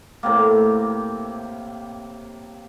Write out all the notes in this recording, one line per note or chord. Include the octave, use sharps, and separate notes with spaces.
A2 C3 A#3